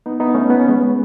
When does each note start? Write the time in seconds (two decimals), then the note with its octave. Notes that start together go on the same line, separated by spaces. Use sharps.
0.06 B3 D#4
0.20 B3 D#4
0.34 A3 C#4
0.50 B3
0.60 C#4
0.68 G#3 B3